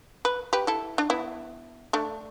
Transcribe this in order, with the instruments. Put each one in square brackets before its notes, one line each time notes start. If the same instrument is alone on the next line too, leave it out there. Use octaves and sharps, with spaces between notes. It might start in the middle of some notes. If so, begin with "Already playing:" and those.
[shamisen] B4
G4 B4
E4 A4
D4
B3 E4
A3 D4